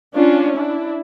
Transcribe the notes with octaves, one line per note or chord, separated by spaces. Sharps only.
C#4 D4 F4
D4 E4